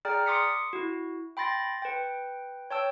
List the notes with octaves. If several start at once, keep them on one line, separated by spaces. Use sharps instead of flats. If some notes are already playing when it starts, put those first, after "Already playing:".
G#4 D5 G5 A#5 F6
C6 D6 D#6 B6 C#7
E4 F#4
G5 B5 C6 A6 A#6
B4 G5
C#5 G5 A5 E6